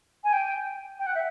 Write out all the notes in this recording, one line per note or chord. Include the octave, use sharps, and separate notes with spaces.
G#5
G5
G5
F#5
E5